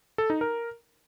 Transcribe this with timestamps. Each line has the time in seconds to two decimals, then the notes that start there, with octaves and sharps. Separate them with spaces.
0.18 A4
0.30 D#4
0.41 A#4